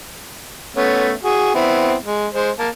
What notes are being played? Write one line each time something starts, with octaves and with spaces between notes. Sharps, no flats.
A3 B3 C#4
F#4 G#4
B3 C4 E4
G#3
G#3 C5
A#3 A5